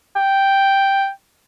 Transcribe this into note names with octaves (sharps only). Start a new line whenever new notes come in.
G5